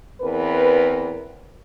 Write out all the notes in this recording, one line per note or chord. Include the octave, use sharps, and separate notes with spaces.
E2 C4 A#4 B4